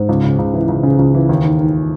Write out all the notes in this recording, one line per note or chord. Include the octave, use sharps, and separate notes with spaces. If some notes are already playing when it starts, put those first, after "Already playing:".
Already playing: G#2
C#2
C#3
C#2
E3
C#2
C#3
C#2
E3
D#2
D#3
D#3